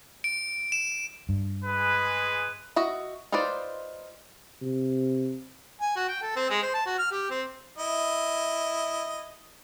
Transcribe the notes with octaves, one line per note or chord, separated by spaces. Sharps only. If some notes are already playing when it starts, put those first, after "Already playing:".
D7
E7
G2
G#3 G#4 B4
F#4 D#5 E5
D#4 F4 B4 C5 D5
C3
G#5
F#4
G5
A4
C4
G#3
C5
A5
F#4
F6
G4
C4
E4 D#5